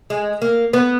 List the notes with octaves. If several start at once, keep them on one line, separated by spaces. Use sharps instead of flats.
G#3
A#3
B3